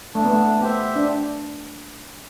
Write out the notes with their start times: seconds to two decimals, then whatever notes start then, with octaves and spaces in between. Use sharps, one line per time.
0.14 A3 D4
0.25 B3
0.34 A3
0.61 B3 G4 C5 E5
0.96 D4